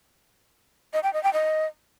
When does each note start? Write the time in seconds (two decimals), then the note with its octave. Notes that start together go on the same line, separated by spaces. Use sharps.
0.93 D#5
1.03 G5
1.13 D#5
1.23 G5
1.33 D#5